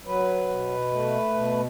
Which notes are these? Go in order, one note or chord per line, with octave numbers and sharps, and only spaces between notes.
F#3 B4
B2
A3
B2